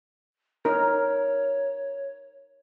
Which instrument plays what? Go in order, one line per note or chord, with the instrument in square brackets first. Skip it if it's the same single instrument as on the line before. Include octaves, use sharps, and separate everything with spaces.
[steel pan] D#4 A#4 [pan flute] C#5